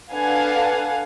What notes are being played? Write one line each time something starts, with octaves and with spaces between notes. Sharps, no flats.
D4 A4 B4 F5 F#5 G#5